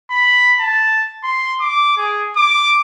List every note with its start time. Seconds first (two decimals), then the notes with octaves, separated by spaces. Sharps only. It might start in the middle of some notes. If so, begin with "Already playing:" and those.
0.11 B5
0.60 A5
1.23 C6
1.60 D6
1.97 G#4
2.36 D6